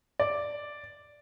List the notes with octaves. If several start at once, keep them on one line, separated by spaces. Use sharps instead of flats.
D5